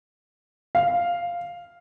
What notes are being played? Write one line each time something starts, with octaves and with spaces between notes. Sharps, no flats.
F5